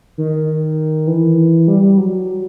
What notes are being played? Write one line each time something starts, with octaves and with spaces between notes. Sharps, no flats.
D#3
E3
G3
F#3